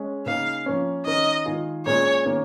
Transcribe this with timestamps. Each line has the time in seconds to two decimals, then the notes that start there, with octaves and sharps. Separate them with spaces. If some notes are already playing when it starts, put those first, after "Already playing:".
Already playing: G#3 C#4
0.26 C#3 A#3 D#4 G#4 F5
0.66 F3 A#3 C#4
1.06 D#3 C#4 A#4 D#5
1.45 D#3 G#3 F4 G#4
1.86 A#2 G#3 C#4 G#4 C#5
2.25 D#3 A#3 C#4